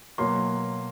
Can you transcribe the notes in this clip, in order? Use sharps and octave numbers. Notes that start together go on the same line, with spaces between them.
B2 F#3 A#3 C6